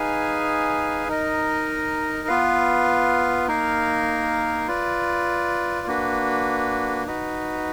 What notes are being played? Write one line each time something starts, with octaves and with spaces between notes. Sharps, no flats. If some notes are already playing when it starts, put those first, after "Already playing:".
Already playing: D#4 G#4 B4 F5 G#5
D#4 A#4 D#5
B3 F4 B4 F5
A#3 D#4 A#4 F5
F4 B4 D5
A#3 D4 F#4 B4
D#4 F#4 B4